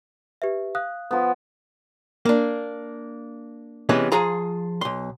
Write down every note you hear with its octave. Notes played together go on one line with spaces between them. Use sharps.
G4 B4 E5
F5 D#6 F#6
F3 B3
A#3 D4
C3 E3 G#3 B3 C#4
F3 F4 G#4 A#5
B1 C6